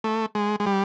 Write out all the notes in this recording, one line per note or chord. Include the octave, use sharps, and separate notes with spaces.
A3
G#3
G#3
G3